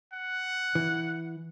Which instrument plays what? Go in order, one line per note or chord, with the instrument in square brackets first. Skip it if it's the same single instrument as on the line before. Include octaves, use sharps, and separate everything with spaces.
[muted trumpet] F#5
[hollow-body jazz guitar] E3